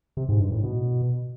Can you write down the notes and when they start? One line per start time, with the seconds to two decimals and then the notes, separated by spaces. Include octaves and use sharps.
0.17 C3
0.29 G#2
0.40 G2
0.52 A2
0.63 B2